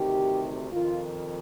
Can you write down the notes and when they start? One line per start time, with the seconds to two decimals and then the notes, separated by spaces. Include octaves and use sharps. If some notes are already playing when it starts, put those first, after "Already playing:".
Already playing: D2 C3 D#3 G4
0.72 F2 D#3 F4